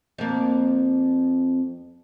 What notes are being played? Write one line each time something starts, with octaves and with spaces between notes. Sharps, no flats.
F2 A#3